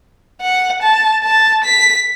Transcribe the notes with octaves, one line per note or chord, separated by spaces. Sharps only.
F#5
A5
A5
B6